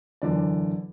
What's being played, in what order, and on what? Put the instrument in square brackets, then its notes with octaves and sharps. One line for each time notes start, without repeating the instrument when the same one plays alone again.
[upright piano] F#1 E2 D3 D5